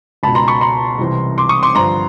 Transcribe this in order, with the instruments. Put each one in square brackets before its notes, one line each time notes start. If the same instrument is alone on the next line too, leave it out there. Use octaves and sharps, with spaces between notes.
[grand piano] C#2 B2 A5 B5
A#5 C6
B5 C#6
A#5 C6
C2 C3 E3
C6 D6
C#6 D#6
C6 D6
G2 D3 F3 A#5 C6